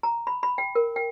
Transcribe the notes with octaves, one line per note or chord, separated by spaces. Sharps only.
A#5
B5
B5
G5
A#4
G5